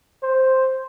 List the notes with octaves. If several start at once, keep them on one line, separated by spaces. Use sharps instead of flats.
C5